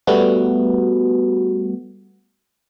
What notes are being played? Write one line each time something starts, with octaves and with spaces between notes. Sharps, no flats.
G3 A3 B3 F#4